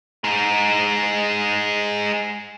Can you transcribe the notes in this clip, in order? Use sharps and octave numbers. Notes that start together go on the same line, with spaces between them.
G#3 D#4